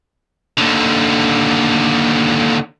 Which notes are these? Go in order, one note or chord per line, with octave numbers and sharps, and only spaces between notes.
D#2 D3